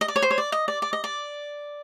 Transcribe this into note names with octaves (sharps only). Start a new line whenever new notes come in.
D#5
D5
C#5
C5
C#5
D5
D#5
D5
D5
D#5
D5